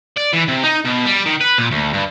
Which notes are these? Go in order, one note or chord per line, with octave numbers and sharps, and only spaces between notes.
D5
E3
C3
D#4
B2
G3
D#3
B4
A#2
D2
G2